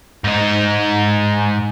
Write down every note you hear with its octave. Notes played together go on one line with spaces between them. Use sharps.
G#2 D#4